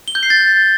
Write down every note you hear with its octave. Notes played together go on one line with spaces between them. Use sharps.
G7
G6
C7
A6